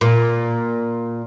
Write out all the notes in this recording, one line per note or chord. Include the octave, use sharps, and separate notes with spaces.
A#2